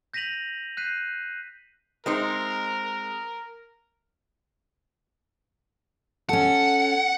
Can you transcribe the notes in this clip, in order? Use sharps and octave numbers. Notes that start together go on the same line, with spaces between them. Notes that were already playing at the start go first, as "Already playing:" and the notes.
G6 A#6 B6 D#7 F7 F#7
F#6 G6 B6 C7 D#7
G#3 C4 D#4 A#4
C#4 A4 F#5